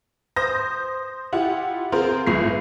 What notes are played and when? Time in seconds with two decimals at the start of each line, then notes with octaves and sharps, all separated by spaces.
0.36 C5 D#6 G6 A#6
1.33 E4 F4 G4 F#5
1.92 C4 F4 G#4 A#4 C5
2.27 G1 C#2 A2 C7